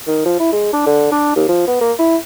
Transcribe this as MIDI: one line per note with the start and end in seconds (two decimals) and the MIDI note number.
0.07 0.22 51
0.25 0.35 53
0.39 0.52 64
0.52 0.72 56
0.73 0.82 62
0.86 1.08 50
1.12 1.31 62
1.36 1.44 39
1.48 1.65 53
1.67 1.76 59
1.81 1.92 58
1.99 2.16 64